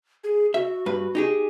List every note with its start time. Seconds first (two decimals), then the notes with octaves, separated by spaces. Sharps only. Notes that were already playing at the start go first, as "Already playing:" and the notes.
0.24 G#4
0.54 F#4 E5
0.86 G2 B4
1.15 D#4 G4 G#4